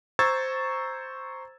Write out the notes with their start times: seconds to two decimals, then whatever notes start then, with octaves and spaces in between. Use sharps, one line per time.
0.19 C5 A#5 C#6 E6 G#6 A6